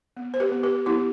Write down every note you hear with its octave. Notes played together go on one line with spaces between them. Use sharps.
B3
C5
G4 B4
B3
G4 B4
B3 E4 G4